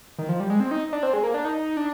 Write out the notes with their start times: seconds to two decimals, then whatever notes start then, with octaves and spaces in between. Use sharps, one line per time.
0.19 D#3
0.29 F3
0.40 G3
0.50 G#3
0.60 C4
0.71 D#4
0.93 D4
1.03 C4
1.13 G#3
1.24 A#3
1.34 D4
1.45 D#4
1.77 D4